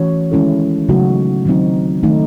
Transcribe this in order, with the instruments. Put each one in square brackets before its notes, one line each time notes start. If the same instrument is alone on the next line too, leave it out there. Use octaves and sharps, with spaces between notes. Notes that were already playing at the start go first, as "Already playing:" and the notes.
Already playing: [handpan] E3 A3 C#4 F#4 C#5
D#3 G#3 C#4 E4 A4
C#3 F#3 A3 D#4 F#4
D#3 F#3 C4 D#4
D#3 A3 D#4